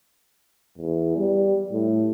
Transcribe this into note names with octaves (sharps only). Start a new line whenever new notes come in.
E2
G3
A2